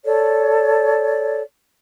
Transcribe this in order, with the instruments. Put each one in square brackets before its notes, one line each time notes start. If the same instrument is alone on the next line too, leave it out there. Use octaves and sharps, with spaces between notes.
[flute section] A4 C#5 D5